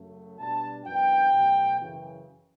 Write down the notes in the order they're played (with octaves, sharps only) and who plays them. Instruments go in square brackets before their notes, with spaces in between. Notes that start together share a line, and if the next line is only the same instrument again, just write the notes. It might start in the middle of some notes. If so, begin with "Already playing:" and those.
Already playing: [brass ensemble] F#2 C#3 F#3 A3
B2 G3 D4 A5
F#2 E3 B3 D4 G5
B2 F#3 A3
F#2 C#3 E3